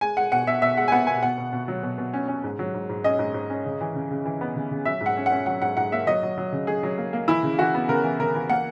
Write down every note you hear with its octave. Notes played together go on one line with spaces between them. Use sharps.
G#3 G#5
G#3 F#5
B2 F#5
B2 E5
B2 E5
G#3 F#5
G#5
B3 F#5
B2 G#5
B2 F#5
B2
B2
F#3
B2
B2
C#4
C#4
G#2
F#3
G#2
G#2
C#4 D#5
G#2
G#2
C#4
C#3
E3
C#3
C#3
E3
B3
C#3
C#3
F#3 E5
G#2
F#5
C#4
F#5
C#4
F#3 F#5
G#2 F#5
G#2 F#5
A#3 E5
F#3 D#5
F#3
F#3
C#3
F#3 G#4
F#3
A#3
A#3
E3 E4
C#3
E3 F#4
B3
C#3 A#4
E3
C#3 A#4
E3
A#3 F#5